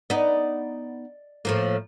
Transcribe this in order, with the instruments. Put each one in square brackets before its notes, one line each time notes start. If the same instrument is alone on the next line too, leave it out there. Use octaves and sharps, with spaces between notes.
[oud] B3 D#4 [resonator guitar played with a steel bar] D5 D#5
[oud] A2 F3 A#3